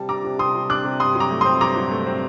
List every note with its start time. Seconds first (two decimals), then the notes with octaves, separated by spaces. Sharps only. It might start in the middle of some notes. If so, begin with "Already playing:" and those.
Already playing: C3 G3 A5
0.09 D4 A#5 D6
0.24 C3
0.39 C3 C6 D#6
0.55 G3
0.70 D4 D6 F#6
0.85 C3
1.00 G2 C6 D#6
1.15 F#3
1.20 A#5 D6
1.31 A3
1.41 C4 C6 D#6
1.61 G2 A#5 D6
1.76 F#3
1.91 A3
2.07 C4